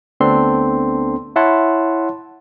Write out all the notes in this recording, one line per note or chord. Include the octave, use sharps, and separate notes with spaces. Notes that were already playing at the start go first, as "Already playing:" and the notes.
D2 B3 C4 D4 A4 C6
E4 C#5 E5 F#5 A5 C6